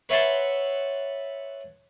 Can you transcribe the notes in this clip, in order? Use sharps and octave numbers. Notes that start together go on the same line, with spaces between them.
B4 C#5 E5 F#5 A5 C6